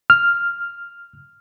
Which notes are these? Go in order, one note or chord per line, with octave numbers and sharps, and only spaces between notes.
F6